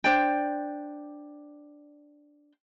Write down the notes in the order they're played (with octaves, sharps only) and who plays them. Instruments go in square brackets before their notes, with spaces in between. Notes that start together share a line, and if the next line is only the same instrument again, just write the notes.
[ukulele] D4 C5 D5 G5